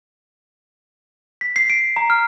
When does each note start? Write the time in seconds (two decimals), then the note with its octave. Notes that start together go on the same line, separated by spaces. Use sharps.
1.41 B6
1.56 C7
1.70 D7
1.96 A#5
2.10 F6